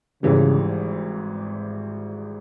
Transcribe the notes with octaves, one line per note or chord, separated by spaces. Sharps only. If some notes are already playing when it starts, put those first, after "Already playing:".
G#1 G#2 C#3 E3 G3